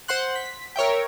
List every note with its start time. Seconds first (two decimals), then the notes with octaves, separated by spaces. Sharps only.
0.08 C5 F#5 C6 F#6
0.36 B6
0.76 A#4 C#5 E5 G5